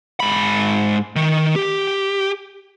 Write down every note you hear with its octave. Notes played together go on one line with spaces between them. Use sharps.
G#2 B5
D#3
G4